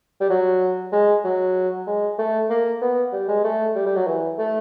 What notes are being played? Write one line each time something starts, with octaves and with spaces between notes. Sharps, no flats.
G3
F#3
G#3
F#3
G#3
A3
A#3
B3
G3
G#3
A3
G3
G3
F#3
E3
A3